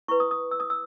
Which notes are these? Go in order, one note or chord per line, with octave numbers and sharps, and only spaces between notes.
E4 B4 C#6
D#6
D#6
E6
D#6
E6